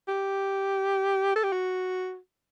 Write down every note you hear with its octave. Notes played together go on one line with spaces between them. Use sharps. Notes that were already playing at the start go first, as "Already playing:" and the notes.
G4
A4
G4
F#4